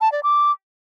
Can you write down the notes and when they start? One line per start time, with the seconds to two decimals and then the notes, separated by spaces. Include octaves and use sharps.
0.01 A5
0.12 D5
0.23 D6